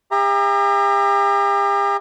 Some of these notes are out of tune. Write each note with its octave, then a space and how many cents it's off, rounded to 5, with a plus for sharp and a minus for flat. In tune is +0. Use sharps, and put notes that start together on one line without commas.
G4 +40 E5 +10 A#5 +0